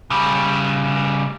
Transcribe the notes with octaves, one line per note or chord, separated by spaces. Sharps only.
C#3 G3